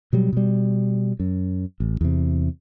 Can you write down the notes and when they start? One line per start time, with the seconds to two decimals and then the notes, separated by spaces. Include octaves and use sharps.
0.13 B2 F#3 G3
0.33 B2 G3
1.20 F#2
1.80 A1
2.01 E2 C3